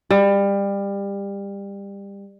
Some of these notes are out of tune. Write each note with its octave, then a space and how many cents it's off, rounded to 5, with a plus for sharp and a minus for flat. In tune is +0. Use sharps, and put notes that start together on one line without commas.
G3 +25